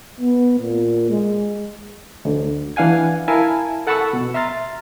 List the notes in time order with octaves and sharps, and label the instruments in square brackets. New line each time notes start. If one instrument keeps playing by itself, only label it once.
[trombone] B3
A#2
G#3
[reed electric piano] D2 D3
E3 D4 F5 F#5 G#5 G#6
E4 A#4 E5 F5 G#5 A5
A4 F#5 A5 B5 C#6 E6
B2
E5 A#5 C6 F6 A6